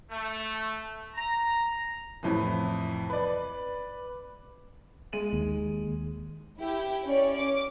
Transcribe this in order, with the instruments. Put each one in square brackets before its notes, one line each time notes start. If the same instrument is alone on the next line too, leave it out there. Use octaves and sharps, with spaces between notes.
[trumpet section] A3
A#5
[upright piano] F2 A2 C3 E3
B4 D5
G#3 D#7 F#7
[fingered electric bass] D#2
[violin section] E4 G4
C#4 C#5 D5
D6